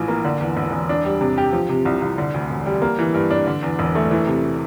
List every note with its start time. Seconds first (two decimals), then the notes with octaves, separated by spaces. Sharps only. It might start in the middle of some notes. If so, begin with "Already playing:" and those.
Already playing: A#1 A2 E3
0.08 A#3
0.24 D3
0.41 E2
0.57 E1
0.72 E1
0.89 D4
1.05 G3
1.21 C3
1.38 G4
1.53 F3
1.69 C3
1.85 C2
2.02 C2
2.18 D3
2.34 D2
2.50 E1
2.66 G3
2.82 A#3
2.99 E3
3.14 G2
3.30 D4
3.47 D3
3.63 E2
3.79 E1
3.95 A3
4.11 E3
4.27 C3